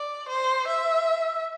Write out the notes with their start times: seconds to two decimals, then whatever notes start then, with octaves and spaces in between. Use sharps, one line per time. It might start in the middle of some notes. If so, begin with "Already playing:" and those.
Already playing: D5
0.29 C5
0.67 E5